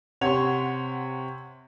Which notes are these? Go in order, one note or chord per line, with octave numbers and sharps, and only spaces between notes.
C3 C#5 F#5 C6 F7